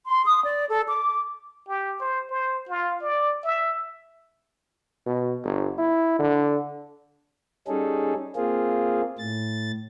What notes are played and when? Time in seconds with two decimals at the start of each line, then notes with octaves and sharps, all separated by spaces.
0.07 C6
0.25 D#6
0.45 D5
0.69 A4
0.89 D6
1.68 G4
2.00 C5
2.30 C5
2.68 F4
3.01 D5
3.44 E5
5.06 B2
5.44 G1
5.78 E4
6.19 D3
7.68 G3 C#4 D#4 G#4 A4
8.36 A#3 C4 F4 G#4
9.18 A2 A6